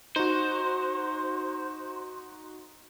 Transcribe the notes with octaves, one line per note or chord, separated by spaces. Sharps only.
D#4 F#4 C5